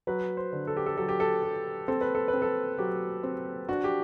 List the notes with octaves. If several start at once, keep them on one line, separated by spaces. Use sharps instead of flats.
F#3 B4
C5
D3
A4
G4
A4
F#3 A4
G4
A4
G4
C4 A4
B4
A4
B4
C4
A4
F#3 G4
C4
D4 F#4
G4